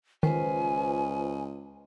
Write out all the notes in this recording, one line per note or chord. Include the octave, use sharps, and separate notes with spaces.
C#2 D#3 F4 B4 C5 G#5